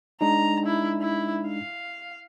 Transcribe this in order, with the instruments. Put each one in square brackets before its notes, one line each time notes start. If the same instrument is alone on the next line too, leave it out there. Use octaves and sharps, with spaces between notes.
[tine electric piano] G#3 D4 D#4 [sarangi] A#5
[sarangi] E4
E4
F5